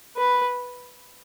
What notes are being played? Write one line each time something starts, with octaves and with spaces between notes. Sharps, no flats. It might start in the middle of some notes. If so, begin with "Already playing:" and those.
B4